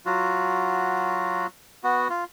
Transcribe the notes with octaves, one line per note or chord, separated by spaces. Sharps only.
F#3 F4 F#4
B3 F#4
F4